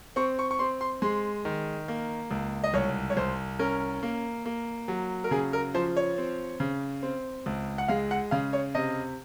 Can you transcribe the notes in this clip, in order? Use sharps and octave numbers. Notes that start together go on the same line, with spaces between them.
C4 C#6
C#6
C#6
C4 C6
C6
G#3 C6
D#3
A#3
C#2
D#5
C2 C#5
C#5
C2 C5
C#4 A#4
A#3
A#3
F#3
A#4
C#3 G#4
A#4
F3 C5
C#5
C4
C#3
C4
C#2
F#5
G#3 F5
F#5
C#3 F5
C#5
C3 D#5